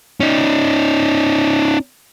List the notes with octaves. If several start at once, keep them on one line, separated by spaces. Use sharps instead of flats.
C#4 D#4